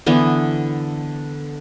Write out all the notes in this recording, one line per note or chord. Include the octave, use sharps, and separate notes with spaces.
D3 E3 B3